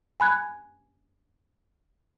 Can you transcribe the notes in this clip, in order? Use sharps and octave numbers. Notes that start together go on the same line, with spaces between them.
G#5 B5 F#6 G#6